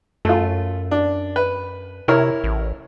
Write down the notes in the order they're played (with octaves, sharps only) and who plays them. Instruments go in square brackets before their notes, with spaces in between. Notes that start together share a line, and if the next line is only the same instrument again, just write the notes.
[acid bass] F#2 [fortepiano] A3 F4
[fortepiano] D4
B4
[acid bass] C3 [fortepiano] E4 A#4 C#5
[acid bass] A1